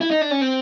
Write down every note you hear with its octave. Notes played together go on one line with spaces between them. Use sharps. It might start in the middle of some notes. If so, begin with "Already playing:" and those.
E4
D#4
D4
C#4
C4